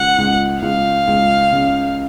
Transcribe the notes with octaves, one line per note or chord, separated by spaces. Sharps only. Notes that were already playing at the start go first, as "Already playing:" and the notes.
Already playing: C#2 F#5
C#2
C#2 F5
C#2
C#3